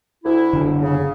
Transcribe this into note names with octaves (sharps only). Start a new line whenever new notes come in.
D2 E4
F#1 D3
C#3